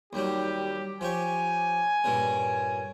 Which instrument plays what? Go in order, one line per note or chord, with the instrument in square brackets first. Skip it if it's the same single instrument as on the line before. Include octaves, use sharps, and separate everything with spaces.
[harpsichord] D#2 F#3 G3 [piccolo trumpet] G4
[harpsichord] F3 G4 C#5 [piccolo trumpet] G#5
[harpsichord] G2 A#2 C#3